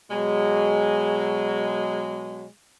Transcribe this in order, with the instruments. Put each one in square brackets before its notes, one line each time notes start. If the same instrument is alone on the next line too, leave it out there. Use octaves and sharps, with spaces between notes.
[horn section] B2 F#3 G#3